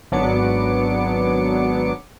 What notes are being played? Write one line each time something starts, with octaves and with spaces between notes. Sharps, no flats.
G#1 F#3 B3 D4 D6 C#7